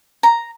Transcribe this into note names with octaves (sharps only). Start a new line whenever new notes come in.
A#5